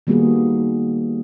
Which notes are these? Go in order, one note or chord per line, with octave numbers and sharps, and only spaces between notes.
D#3 G3 A#3 B3 F#4 G#4